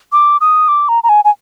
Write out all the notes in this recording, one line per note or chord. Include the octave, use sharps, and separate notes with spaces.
D6
D#6
D6
A#5
A#5
G#5
G#5